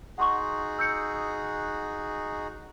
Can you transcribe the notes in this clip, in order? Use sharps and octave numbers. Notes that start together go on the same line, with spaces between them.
D#4 F#4 G#4 F#5 C6 C#6
E6 G6 C#7